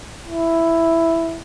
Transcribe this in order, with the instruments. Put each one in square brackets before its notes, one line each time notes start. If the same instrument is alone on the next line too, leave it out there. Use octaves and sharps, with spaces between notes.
[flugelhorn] E4